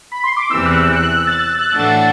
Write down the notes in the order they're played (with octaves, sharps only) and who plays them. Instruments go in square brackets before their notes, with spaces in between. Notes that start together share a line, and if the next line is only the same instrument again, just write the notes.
[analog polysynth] B5
C6
D6
[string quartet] E2 C3 E3 [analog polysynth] E6
[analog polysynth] F#6
F#6
F#6
A6
F#6
[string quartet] A2 E3 A3 D4 F#4 [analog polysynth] A6